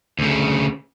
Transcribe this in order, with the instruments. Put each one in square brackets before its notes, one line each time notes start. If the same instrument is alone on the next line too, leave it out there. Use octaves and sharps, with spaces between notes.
[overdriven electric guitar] D2 C#3